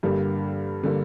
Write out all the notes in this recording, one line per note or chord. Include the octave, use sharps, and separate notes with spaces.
G2 D3 G3 A#3
D3 G3 A#3